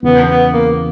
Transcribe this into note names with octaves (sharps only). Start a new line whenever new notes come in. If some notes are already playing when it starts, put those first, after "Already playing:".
E2 C#3 E3 B3
B3
A#3